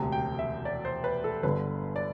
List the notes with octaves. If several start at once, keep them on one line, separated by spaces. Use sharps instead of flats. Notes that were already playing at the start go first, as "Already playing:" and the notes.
Already playing: E1 D2 C3
G5
E5
D5
C5
B4
A4
G1 G2 D3 B4
D5